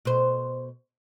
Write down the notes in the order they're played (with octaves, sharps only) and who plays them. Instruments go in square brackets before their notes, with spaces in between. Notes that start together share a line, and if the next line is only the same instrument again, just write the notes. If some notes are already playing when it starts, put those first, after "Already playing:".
[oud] B2 C5